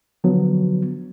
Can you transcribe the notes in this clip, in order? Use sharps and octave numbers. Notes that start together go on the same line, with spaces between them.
D3 F3 F#3 B3